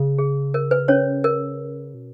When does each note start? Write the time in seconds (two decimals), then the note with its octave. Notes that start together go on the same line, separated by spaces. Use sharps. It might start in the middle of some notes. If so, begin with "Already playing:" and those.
Already playing: C#3
0.18 G#4
0.54 A#4
0.71 B4
0.88 C#4 C#5
1.24 A#4
1.94 B2